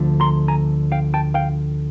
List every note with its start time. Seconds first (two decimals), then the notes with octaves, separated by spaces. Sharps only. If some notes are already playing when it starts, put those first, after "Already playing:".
Already playing: D2 D3 F3 A3
0.20 A#5 C6
0.48 G#5 A#5
0.92 F5 G5
1.14 G5 A5
1.34 F5 G5